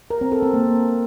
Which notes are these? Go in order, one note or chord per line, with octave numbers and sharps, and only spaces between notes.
A#4
C4
A4
C4
A#3